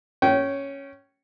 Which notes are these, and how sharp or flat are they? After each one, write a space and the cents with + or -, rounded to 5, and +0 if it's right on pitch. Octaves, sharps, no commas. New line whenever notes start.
C#4 +0 G5 -25